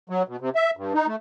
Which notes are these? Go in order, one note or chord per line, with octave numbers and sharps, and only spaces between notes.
F#3
B2
C3
E5
G2
D#4
A3